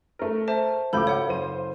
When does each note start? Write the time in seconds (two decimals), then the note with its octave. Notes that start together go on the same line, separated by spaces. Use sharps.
0.19 A3 A#4
0.48 C5 E5 A5
0.93 G#1 C#2 A4 B5 D6 G6
1.07 C#5 F#5
1.28 F#1 C5 D#7